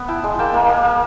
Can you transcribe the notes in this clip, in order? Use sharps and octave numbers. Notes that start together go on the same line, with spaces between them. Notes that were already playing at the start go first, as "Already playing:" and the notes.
Already playing: B3
E4 G5 A5
G#3
A#3 G5 A5
A#3
A#3
A#3